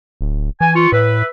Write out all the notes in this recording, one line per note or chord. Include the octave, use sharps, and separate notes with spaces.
D1
E3 G#5
F4 C#6
A2 B4 E5